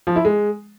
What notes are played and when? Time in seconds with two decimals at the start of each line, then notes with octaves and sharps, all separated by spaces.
0.07 F3
0.16 E4
0.25 G#3